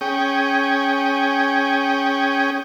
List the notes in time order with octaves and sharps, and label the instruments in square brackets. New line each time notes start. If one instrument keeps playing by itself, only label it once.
[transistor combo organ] C#4 G#4 G5